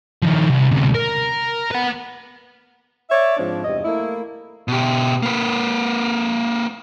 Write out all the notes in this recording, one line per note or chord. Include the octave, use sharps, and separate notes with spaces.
D#3 F3
C2
D2 C3
A#4
B4 F#5
C#5 D5 E5
G#2 F3 C4 D4
E2 G2 C3 D#5
A3 A#3 E4
B2 G4
A#3 B4